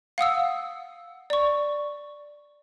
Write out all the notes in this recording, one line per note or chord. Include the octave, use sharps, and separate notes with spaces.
F5 F#5 D#6 E6
D5 C#6